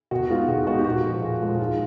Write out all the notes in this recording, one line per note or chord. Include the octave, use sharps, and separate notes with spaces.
B2 F#4
G#3 B3 D#4 F4
B2 F#4
G#3 B3 D#4 F#4
G4
A#2 F#4
F3 G#3
A#2
F3 G#3
G#2 F4